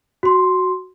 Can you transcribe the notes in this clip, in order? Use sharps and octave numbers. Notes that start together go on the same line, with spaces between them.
F#4 C6